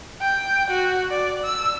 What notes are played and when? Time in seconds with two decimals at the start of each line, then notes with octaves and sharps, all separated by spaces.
0.22 G5
0.71 F#4
1.11 D5
1.45 E6